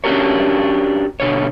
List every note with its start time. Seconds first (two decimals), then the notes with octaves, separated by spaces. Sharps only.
0.04 C#4 D4 F#4 G4 A#4 C#5
1.20 B2 D3 C#5